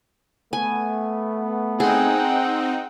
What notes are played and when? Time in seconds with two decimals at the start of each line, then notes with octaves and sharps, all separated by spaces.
0.53 A3 B3 G#5
1.80 C4 D#4 G#4 F#5 G5